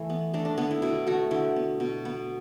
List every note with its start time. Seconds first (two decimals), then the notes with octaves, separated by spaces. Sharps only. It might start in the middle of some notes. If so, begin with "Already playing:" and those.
Already playing: E3 A3 E4
0.10 B3
0.34 A3 D4
0.45 D4
0.58 D3 B3
0.71 E4
0.82 B2 E4
1.07 A3 F#4
1.31 D3 E4
1.56 B3
1.80 B2
2.05 B3